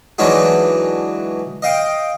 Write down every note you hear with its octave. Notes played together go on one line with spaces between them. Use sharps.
E3 F#3 G#3 D4 D#4 F#4
D#5 F5 G5